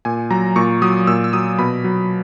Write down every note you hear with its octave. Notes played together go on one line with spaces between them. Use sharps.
A#2 G#5
F#3 A#5
A#2 C#6
F#3 D#6
A#2 E6
E6
F#3 D#6
B2 B5
F#3